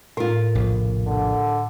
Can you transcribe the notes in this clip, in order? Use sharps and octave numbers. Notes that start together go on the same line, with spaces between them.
A2 F4 A#4
F1 A#1
D3